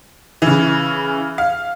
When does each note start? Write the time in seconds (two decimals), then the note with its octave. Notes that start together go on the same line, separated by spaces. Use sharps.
0.42 C#3 E3
1.38 F5